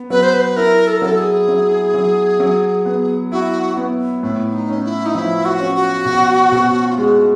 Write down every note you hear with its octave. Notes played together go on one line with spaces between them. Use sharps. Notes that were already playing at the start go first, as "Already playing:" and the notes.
Already playing: B3
F#3 B4
C5
B4
E4 A#4
A4
A#4
F#3 A4
G#4
F#3
F#3
F#3
B3
E4 F#4
B3
A2 E4
D#4
C#4
E4
D#4
F3 E4
F#4
C#4
F#4
B2
B2
F4
G#3 F#4